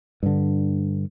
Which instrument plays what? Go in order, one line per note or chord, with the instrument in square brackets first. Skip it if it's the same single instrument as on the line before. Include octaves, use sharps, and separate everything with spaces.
[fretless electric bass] G2 D3